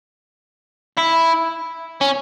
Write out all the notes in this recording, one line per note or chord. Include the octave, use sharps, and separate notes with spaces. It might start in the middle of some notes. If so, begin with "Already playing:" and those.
E4
C#4